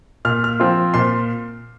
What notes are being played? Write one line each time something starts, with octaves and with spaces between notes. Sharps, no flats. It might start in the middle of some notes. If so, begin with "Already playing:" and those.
A#2 F6
F6
F3 C4 F4
A#2 C6